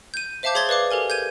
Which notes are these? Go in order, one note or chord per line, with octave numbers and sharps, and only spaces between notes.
G6 D#7
C5 E5 F5 A5 D6 G6
G#4 C#5 C6 G#6 A6 G7
B4 D5 F5 D6
G4 A4 A#4 G#5
G6 G#6 D#7